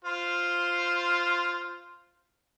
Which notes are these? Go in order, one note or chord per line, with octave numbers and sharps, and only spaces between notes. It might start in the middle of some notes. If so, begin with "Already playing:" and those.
F4 C5